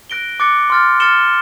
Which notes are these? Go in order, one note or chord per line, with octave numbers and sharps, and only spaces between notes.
F#6 A#6 D7 G7
D6 F#6 A6 C#7
C6 F6 A6
F6 A6 C#7 E7 G7